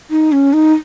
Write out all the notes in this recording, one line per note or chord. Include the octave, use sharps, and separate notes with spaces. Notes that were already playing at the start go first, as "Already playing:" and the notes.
D#4
C#4
D#4